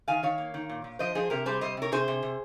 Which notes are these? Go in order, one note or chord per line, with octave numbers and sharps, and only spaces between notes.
D#3 F5 G#5
D#3 C#5 F5
A#3
D#3
A#2
A#2
F3 C5 D#5
F3 G#4 C5
C3 G4 A#4
G3 G#4 C5
C3 C5 D#5
C3 A#4 C#5
C3 G#4 C5
C3
C3